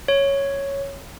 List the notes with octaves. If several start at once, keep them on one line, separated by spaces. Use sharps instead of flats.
C#5